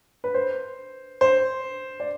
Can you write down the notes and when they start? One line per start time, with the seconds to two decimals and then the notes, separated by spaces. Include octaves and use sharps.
0.24 B4
0.34 C5
1.21 C5
2.00 D5